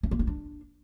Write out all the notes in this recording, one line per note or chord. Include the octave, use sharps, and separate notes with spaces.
C#4
A#3
D#4
D4